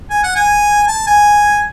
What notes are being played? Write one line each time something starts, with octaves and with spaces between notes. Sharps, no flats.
G#5
F#5
G#5
A5
G#5